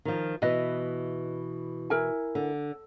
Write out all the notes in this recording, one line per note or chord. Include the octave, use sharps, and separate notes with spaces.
D#3 F3
B2 E3 B4 D#5
E4 A#4 G#5
D3